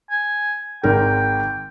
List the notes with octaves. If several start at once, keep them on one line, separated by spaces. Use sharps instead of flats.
G#5
G#1 G#2 A#4 G5